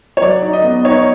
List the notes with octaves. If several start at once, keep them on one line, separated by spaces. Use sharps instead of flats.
C#5
F#3 D5
D#4
D#5
B3
D#4 C#5